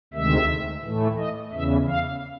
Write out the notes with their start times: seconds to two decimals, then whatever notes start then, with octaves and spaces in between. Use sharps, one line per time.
0.13 D2 C3 D#3 G#3 E5
0.83 A2 E3 A3
1.18 D#5
1.53 E2 C#3 E3 E5
1.88 F5